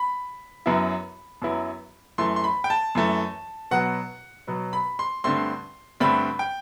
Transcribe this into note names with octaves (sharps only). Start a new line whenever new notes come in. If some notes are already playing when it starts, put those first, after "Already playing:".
Already playing: B5
F#2 F#3 B3 E4
F#2 F#3 B3 E4
F#2 E3 A3 C6
C6
B5
G5
A5
F#2 E3 A3
B2 F#3 B3 F#5
B2 F#3 B3
B5
C6
G2 D3 A3 C4 C6
G2 D3 A3 C4 B5
G5